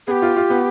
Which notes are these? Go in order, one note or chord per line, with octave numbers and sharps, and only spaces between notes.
B3 G4 G#4
F4
F4
B3